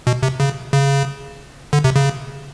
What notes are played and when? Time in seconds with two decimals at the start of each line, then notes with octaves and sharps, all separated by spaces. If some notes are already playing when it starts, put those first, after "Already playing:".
0.07 B2
0.23 C3
0.40 C#3
0.73 C#3
1.73 D3
1.84 C3
1.96 C#3